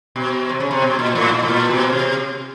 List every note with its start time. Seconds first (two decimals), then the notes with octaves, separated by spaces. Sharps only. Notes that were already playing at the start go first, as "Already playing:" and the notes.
0.16 B2
0.49 C3
0.60 C#3
0.71 C3
0.82 B2
0.99 A#2
1.15 A2
1.32 A#2
1.43 A2
1.48 A#2
1.70 B2
1.92 C3